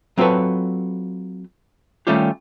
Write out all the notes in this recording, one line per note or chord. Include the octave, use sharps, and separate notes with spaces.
F#3 C4 F4 A4 B4 C#5
D#3 G3 A3 C#4 F4 G4